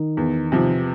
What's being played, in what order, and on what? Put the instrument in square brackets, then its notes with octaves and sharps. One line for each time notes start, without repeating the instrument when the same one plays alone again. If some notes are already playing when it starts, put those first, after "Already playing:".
Already playing: [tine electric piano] D#3 D#4
[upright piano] E2
C3 F3